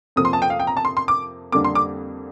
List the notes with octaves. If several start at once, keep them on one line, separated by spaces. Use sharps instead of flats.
F2 C3 F3 A#3 D#6
C6
A5
G5
F5
G5
A#5
A5
C6
C6
D6
F2 D3 G3 A#3 D4 D6
C6
D6